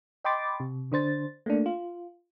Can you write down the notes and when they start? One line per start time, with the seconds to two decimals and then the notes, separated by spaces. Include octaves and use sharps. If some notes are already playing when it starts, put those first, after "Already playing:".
0.24 D#5 G5 B5 C6 D6 A6
0.60 C3
0.92 D3 D4 C5 A6
1.46 A3 A#3 D4
1.66 F4